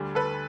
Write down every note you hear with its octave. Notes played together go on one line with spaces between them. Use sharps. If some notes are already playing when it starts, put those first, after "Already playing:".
Already playing: D2 D3 G3
A4 B4